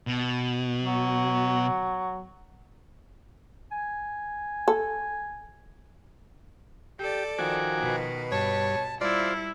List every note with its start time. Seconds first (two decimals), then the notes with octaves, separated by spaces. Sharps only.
0.07 B2
0.82 F#3
3.71 G#5
4.68 A4
6.99 G4 A4 D5
7.39 D#3 F3 F#4 G#5 D6
7.81 B2 B4
8.32 G2 C#5 A5
9.01 G3 E4 F4 C5 D5